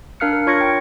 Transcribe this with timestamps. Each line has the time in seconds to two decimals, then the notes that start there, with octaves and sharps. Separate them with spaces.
0.20 D4 A#4 F5 F6 F#6 C#7
0.33 A#4
0.47 F4 C#5 C#6 G#6 A#6 C#7
0.61 G5